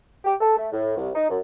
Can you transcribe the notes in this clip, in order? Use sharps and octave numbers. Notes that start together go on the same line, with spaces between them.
G4
A4
A3
A2
C2
D#4
F#2